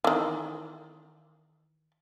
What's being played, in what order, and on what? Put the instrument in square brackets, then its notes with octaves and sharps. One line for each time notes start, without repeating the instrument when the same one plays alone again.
[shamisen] D#3 E3